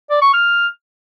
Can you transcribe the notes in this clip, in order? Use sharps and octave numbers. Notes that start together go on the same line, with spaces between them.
D5
C#6
F6